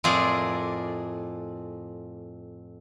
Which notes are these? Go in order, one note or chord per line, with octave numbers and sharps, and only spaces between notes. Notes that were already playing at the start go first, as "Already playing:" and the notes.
F2 A2 F4 G#4 A#4 D5